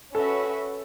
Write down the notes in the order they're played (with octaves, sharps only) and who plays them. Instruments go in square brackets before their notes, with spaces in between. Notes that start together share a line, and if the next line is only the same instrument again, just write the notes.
[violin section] C#4 F#4 B4 E5 [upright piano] A4